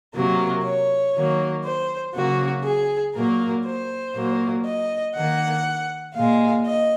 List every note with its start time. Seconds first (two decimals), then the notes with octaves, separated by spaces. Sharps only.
0.15 C3 F#3 A#3 A#4
0.64 C#5
1.15 D#3 F#3 A#3
1.64 C5
2.15 C#3 F#3 A#3 F#4
2.64 G#4
3.14 A#2 F#3 A#3 A#4
3.66 C5
4.15 A#2 F#3 A#3
4.66 D#5
5.15 D#3 A#3 F#5
6.15 A#2 G#3 F5
6.66 D#5